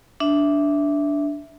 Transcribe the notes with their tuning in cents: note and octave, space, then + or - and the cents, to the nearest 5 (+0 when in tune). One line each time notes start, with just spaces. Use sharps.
D4 -10 E5 +0